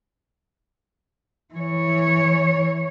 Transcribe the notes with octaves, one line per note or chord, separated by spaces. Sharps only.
E3 C#5